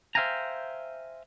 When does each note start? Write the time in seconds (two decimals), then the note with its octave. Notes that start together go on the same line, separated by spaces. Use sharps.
0.15 C5 E5 F5 G5 G#5 A#5